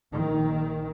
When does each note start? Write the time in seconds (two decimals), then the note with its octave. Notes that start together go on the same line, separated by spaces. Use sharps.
0.11 A#1 D#3